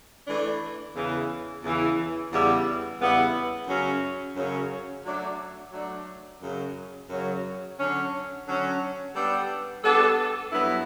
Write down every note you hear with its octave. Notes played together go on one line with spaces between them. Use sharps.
E3 A3 D4
E2 C#3 E3
E2 C#3 E3
E2 C#3 G3 B3 E4
E2 C#3 G3 B3 E4
F#2 C#3 F#3 C#4
F#2 C#3 F#3 C#4
F#3 A3 D4
F#3 A3 D4
F#2 C#3 F#3
F#2 C#3 F#3
D3 F#3 C#4
D3 F#3 C#4
G3 B3 D4 A4
G3 B3 D4 A4
G2 F#3 B3 E4 B4